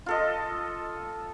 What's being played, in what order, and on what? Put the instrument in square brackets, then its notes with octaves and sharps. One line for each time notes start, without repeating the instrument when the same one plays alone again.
[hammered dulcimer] F4 A4 D#5